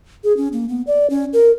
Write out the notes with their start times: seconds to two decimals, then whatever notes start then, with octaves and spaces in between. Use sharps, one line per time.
0.24 G#4
0.37 C#4
0.53 A#3
0.68 B3
0.87 D5
1.10 C#4
1.33 A#4